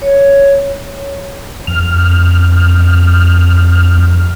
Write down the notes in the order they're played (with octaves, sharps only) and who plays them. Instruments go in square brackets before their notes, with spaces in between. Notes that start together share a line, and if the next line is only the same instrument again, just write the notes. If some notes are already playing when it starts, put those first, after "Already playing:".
[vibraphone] C#5
[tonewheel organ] F2 F6